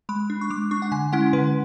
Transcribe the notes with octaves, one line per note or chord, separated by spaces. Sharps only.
G#3 B5
D4
C#6
G#3 D6
D4 C#6
F#5
D3 G#5
G#3 C#4 E4 F#5
D3 B4